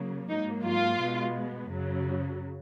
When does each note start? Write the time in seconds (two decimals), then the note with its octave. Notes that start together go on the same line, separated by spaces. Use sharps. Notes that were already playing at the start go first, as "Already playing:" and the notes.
Already playing: C#3 F#3 A#3
0.30 G#2 F#3 A#3 D#4
0.65 F4
0.99 B2 G#3 B3
1.69 F#2 C#3 F#3